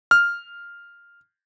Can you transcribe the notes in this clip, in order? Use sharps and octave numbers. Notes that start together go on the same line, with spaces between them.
F6